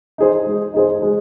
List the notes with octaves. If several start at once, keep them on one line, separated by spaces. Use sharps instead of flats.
D#4 G#4 C5
G#3
D#4 G#4 C5
G#3